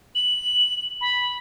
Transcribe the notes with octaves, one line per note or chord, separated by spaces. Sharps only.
F#7
B5